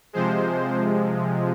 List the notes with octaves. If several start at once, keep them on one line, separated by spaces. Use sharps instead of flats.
C3 F3 G#3 C5